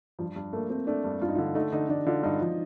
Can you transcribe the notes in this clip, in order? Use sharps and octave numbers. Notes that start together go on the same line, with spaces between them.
G2 F3
G2
A3 A#3
A3 C4
A3 D4
G2
G2 F4
D#4
F4
D3
A3 D#4
D3 D#4
D3 D4
D3 F4
G2 D#4
F3